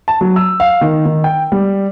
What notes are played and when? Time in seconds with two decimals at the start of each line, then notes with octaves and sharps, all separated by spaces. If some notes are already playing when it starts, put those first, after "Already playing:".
0.08 A5
0.21 F#3
0.36 E6
0.60 F5
0.81 D#3
1.05 D#3
1.24 G5
1.52 G3